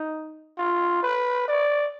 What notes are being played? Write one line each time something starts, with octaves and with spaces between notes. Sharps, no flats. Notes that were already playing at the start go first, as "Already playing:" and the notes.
Already playing: D#4
F4
B4
D5